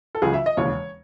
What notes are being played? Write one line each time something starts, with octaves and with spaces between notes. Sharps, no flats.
A4
C#2 C#3 F#3 G#4
E5
D#5
E1 D#2 C#3 E3 C#5